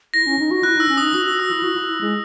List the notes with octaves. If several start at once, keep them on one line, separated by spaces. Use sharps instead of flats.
E4 A#6
C#4
D#4
F#4
E4 F#6
D#4 E6
C#4
D#4 D#6
F#4 D#6
F#4
F#4 E6
E4
F#4
E4
E4
G#3